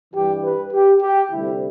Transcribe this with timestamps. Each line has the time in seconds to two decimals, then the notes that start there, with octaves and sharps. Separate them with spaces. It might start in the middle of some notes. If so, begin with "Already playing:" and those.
0.13 G2 E3 G3 G4
0.42 B4
0.72 G4
1.01 G4
1.31 D2 C3 G3 E4